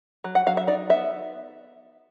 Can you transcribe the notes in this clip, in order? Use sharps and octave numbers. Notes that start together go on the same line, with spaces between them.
F#3
F#5
F#3 F5
E5
D#4 D5
B3 E5